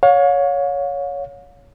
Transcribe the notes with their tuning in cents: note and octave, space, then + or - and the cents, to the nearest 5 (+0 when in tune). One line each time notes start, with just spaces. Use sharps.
C#5 +15 F5 +40